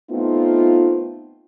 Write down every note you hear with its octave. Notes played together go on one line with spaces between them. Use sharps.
A3 B3 C4 D#4 F4